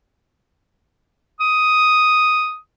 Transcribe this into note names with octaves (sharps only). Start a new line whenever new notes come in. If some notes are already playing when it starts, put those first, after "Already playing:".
D#6